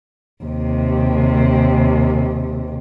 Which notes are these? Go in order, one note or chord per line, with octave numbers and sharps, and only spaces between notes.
D#2 C3